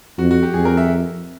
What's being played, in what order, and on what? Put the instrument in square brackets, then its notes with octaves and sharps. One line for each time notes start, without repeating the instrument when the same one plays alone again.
[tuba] F2 [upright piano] F#4
[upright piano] F#4
G4
[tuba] F2 [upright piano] G#4
[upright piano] A#4
E5